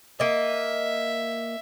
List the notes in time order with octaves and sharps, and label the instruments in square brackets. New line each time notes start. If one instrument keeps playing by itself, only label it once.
[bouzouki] A#3 D#5 [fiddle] E5